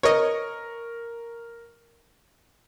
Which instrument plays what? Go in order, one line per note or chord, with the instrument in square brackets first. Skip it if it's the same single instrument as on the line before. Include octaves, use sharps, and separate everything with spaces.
[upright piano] A#4 C#6 [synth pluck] C#5 D#5